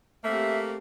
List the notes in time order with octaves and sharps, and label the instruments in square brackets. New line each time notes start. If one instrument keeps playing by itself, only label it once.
[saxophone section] A3 A#3 [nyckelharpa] C4 G4 [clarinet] E5